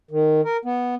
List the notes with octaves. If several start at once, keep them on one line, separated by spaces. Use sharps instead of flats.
D#3
A#4
B3